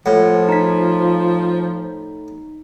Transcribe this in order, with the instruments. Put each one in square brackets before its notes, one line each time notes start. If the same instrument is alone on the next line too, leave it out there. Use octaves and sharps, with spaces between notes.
[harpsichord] A2 [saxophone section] F3 [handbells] F#5
[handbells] D#4 B6